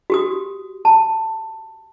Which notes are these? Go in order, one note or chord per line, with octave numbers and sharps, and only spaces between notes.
F#4 G4 D#6
A5